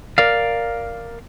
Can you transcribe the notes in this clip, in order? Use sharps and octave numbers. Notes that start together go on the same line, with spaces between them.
A#4 D5 F5